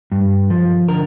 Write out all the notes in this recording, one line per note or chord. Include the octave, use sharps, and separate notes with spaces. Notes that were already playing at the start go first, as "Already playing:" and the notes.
G2
F3
D3 A#4